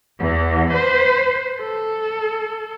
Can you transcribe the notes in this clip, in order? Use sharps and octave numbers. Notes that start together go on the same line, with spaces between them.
E2 E3
B4 C5
A4